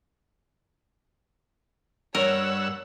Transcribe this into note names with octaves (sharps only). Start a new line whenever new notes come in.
G2 A#4 C#5 F#5 E6